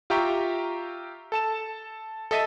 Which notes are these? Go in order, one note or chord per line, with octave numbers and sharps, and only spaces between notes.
F4 G4 E5 G5 A#5 C#6
A4 A5 E7
A4 D#5 E5 A6 D#7